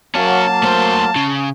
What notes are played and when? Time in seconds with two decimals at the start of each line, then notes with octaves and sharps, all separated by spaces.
0.15 F#3 A#3 C#4 F#4 F5 A5
0.63 A3 C5
1.16 C#3